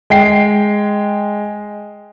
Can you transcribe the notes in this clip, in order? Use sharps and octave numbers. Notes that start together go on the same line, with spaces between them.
G#3 G5 C7